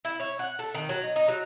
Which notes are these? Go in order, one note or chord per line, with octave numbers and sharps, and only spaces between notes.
E4
C#5
F#5
A3
D#3
F#3
D#4
D#4
F#3